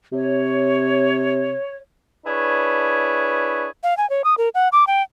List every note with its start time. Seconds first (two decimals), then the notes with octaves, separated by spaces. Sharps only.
0.12 C3 C#5
2.26 D4 E4 G#4 B4 C#5
3.83 F5
3.97 G#5
4.10 C#5
4.24 D#6
4.38 A#4
4.54 F#5
4.72 D6
4.87 G5